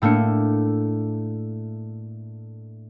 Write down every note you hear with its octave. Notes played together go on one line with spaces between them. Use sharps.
A2 A3 A#3 D4 C#7